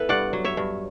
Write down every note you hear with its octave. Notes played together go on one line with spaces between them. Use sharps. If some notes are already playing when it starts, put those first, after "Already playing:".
Already playing: B3 E4 A4 B4
G2 D5 F#5
F#3
C#5 E5
G2